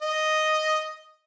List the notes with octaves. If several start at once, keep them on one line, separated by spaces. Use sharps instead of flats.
D#5